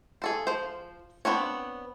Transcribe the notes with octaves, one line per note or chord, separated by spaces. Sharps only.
G#4 A4 C5
F3 C5
B3 C4 D4 C#5